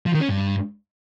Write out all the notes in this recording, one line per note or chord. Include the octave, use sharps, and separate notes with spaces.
F3
D#3
C#4
G2